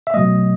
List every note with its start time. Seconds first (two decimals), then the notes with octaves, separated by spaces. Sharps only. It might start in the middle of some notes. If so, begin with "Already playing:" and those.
0.07 E5
0.14 B2 F#3 A3 D#5